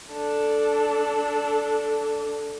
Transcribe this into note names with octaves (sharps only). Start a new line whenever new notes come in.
D4 A4